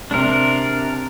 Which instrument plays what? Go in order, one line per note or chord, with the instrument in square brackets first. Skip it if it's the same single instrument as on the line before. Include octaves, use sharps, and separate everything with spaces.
[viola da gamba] C3 [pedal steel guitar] D4 A#4